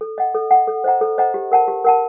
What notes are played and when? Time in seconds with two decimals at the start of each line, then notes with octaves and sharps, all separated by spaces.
0.01 A4
0.18 D#5 F#5
0.34 A4
0.51 D#5 F#5
0.68 A4
0.84 C5 D#5 F#5 A#5
1.01 A4
1.18 C5 D#5 F#5 A#5
1.34 G4
1.52 A#4 F#5 A5
1.68 G4
1.84 A#4 F#5 A5